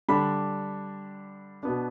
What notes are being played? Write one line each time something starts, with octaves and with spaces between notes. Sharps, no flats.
D3 G3 D4 B5
B2 B3 D4